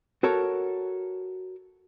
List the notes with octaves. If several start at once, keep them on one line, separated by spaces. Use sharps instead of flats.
F#4 A4 A#4 C#5